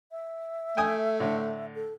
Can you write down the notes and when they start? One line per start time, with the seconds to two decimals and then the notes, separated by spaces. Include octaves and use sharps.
0.11 E5
0.77 A3 G5 G#5 D#6
1.20 A2 D3
1.75 A4